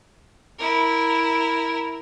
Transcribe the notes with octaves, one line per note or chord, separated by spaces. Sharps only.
E4 A#4